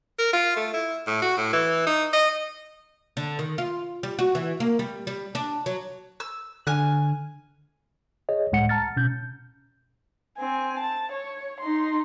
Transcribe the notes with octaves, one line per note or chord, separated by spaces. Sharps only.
A#4
F4
A3
E4
A2
F#4
A2
E3
D#4
D#5
D3
D#3
F4
G3
F#4
E3
A#3
G3
G3
D4
F#3
E6
D3 G#5 F6 F#6
G#4 C#5 D#5
C#2 A2 G#3 F#5 C#7
A5 A#5 F6 A6
B2 C#4 G6
C4 G#5
A5
C#5
D#4 C6